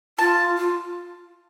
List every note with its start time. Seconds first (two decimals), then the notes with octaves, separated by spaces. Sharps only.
0.19 F4 A5
0.57 F4